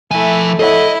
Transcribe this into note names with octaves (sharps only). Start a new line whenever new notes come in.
F3 A3 E4 G#5
E4 A4 C#5 D#5 F#5